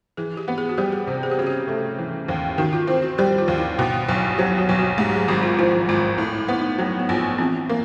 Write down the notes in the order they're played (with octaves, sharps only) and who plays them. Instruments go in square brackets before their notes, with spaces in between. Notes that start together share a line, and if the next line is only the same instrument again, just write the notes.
[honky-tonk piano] E3 [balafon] G#4
[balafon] G4
[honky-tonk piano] B3
[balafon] G#4
F#4
[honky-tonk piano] G3 [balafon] G4
[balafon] G#4
[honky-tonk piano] C3 [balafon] G4
[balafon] G#4
G4
[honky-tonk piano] C#3 [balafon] F#4
[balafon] G4
[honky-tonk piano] A3
E3
D#2
[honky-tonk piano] D#3 [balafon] F#4
[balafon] F4
[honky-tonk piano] C4 [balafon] E4
[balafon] F#4
[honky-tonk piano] G3 [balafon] G4
[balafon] F4
[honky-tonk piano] D#2
[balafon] E4
[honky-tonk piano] B2 [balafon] E4
[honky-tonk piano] B1
[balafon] F#4
[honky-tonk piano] F#3 [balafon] G4
[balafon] F#4
[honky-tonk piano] B1
[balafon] F#4
[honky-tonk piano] G#2 [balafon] G4
[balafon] G4
G#4
[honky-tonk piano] G#1 [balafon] F#4
[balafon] F4
[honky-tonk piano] F3 [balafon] E4
[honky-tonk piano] G#1 [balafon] F4
[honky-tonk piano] A2
[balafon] E4
[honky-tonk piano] B3 [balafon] E4
[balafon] D#4
[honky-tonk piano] F#3 [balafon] B3
[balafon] B3
[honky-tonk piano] A#1
[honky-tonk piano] E3 [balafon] C4
[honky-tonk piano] A#3